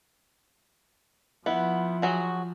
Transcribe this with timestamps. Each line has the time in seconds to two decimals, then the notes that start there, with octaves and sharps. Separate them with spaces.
1.46 F3 B3 E4 F#5
2.02 F#3 F#4 G#4